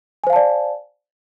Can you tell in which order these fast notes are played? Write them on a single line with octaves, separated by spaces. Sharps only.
G#5 C5 F5 A5 D5